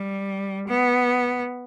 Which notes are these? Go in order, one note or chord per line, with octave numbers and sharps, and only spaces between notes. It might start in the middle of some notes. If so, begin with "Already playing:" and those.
Already playing: G3
B3